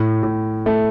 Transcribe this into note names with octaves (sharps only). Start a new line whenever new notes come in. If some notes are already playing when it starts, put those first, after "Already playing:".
Already playing: A2
A2
A3